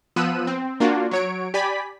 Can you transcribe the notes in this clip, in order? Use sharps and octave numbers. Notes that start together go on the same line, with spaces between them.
F3 B3 E6 F#6 D#7
C4
A#3 D4 F4 F#4
F#3 C#5 D7
G4 D5 G#5 B5 B6